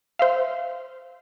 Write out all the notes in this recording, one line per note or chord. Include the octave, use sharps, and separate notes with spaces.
C5 E5 F5